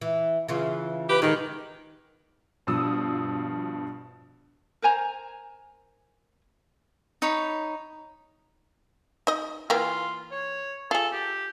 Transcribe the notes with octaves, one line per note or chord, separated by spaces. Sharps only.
E3
C#3 E3 F4
G4 B4
G#2 D#3 G#4 A#4
G2 B2 F3 D#6 E6
A#4 C5 G#5 A#5
D#4 C#5 B5
D#4 D#5
E3 A#3 F4 G4
C#5
F4 G#4 A4
G4